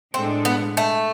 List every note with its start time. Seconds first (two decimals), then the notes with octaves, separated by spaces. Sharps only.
0.13 A2 G#3 C4 D4 A4
0.45 B3
0.77 A3